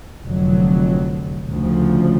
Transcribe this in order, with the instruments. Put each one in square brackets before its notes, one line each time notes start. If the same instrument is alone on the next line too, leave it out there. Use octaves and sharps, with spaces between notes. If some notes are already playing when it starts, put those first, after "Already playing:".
[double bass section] F1 F2 D3 F#3
D2 C#3 F3